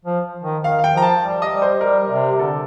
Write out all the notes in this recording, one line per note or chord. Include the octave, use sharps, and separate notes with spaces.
F3
D#3
D#3 F5
F5
G5
F3 A#5
A5
G3
D#5
G3
C5
G3 A#4
C3
D3 A4